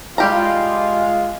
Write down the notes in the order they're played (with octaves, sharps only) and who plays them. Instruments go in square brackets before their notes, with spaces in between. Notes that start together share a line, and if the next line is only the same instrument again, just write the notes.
[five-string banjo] G3 G4 A#5 [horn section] G#3 F4